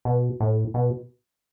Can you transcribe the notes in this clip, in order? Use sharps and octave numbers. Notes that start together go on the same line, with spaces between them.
B2
A2
B2